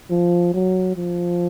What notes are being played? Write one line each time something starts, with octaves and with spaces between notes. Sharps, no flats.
F3
F#3
F3